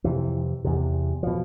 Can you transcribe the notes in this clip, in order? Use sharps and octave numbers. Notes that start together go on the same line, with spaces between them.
F2 C3 E3
E2 C3
B2 F3